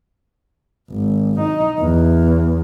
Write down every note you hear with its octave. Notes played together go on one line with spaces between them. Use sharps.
G#1
D#4
E2